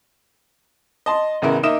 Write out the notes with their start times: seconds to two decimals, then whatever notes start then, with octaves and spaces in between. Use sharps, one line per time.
1.06 D#5 A5 C6
1.42 A1 C#3 B3 E4 A#4
1.63 A#3 D#4 A#4 E5 D#6 E7